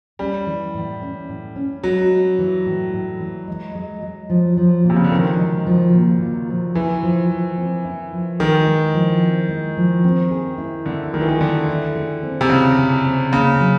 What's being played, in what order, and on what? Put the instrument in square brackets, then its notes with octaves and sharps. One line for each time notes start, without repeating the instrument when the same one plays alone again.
[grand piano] G3 [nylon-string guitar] C#4
[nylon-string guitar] E3
A2
C#4
A2
C#4
[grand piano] F#3 [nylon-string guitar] G#3
[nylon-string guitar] C#4
E3
A2
A2
E3
G#3
G#3
G#3
F3
F3
A#2
[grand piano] C3
C#3
D3
[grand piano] D#3 [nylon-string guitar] F3
[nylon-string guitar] G#3
F3
A#2
A#2
F3
[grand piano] E3 [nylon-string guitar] E4
[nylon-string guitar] F3
F3
C4
E4
F3
[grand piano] D#3 [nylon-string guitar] G#3
[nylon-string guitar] G#3
F3
C4
G#3
F3
C4
G#4
E4
[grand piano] D3 [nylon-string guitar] E4
[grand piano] D#3 [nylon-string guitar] A3
[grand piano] E3
D#3
[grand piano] D3 [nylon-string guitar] A3
[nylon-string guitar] E4
G#4
C4
[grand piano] C3
[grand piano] C#3 [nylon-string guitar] E4
[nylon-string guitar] G#4
C4
[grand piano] C#3 [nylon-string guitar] A#3
[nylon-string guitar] F#3